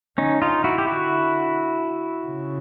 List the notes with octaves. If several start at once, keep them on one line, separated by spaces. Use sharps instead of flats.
D3 C#4 D#4
D#4 F4
E4 F#4
G4
D3 E4 F#4
C#3